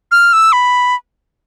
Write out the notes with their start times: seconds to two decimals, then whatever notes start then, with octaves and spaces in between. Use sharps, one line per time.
0.12 F6
0.33 E6
0.53 B5